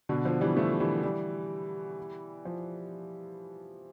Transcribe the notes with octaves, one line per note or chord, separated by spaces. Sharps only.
B2 D3
D3 F3
E3 G3
F3 A3
E3 G3
E3 G3
F3